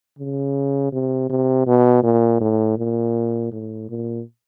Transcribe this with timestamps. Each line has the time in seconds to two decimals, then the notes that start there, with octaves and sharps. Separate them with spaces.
0.19 C#3
0.92 C3
1.30 C3
1.67 B2
2.03 A#2
2.40 A2
2.78 A#2
3.52 A2
3.89 A#2